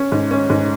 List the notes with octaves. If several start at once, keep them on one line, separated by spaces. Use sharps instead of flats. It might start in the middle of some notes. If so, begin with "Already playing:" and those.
Already playing: C#4
G#2
C#4
G#2